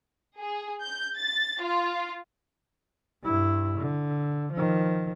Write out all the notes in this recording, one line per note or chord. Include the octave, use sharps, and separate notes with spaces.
G#4
G6
A6
F4
G2 E4
D3
D#3 F3